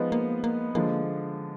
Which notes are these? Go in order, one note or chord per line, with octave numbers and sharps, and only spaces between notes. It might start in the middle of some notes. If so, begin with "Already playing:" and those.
Already playing: F3 G#3 B3 D#4
A#3
A#3
D3 F3 G#3 A#3